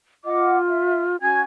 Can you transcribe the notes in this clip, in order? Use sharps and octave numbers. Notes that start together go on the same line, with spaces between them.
F4 D#5 F#5 D6
E5
C#4 F#4 G#5 G#6